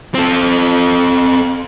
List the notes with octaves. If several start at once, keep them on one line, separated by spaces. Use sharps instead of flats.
C4 A4